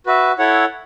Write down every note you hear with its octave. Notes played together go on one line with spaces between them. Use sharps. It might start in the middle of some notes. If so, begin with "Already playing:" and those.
F#4 B4 E5
E4 A4 C#5 F#5